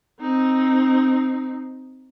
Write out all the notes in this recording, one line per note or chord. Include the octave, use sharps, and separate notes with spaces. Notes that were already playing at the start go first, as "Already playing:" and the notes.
C4 D#4